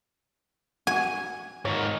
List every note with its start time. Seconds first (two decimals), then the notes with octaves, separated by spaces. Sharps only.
0.87 F#4 G#5
1.65 G#2 D#3 F4 C#5